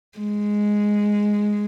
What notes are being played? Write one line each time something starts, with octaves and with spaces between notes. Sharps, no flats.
G#3